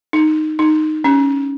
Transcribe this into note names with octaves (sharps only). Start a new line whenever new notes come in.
D#4
D#4
C#4